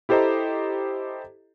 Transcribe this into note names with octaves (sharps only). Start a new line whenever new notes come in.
E4 G4 A4 C5 D#5 A#5